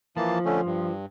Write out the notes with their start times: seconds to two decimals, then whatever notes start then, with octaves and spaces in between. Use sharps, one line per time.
0.17 E3 F3 A#3 A5
0.45 D3 A3 C#4
0.66 G2